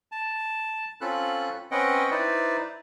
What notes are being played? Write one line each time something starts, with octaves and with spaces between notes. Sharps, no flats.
A5
C4 C#4 F4 A4 B5 F#6
C4 C#4 B4 D#5 F#5 G5
D#4 E4 B4 C5 D5